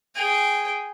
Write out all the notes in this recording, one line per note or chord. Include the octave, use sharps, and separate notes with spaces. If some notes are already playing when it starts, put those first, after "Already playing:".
G#4 G5